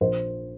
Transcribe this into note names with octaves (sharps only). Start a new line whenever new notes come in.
A#1 C5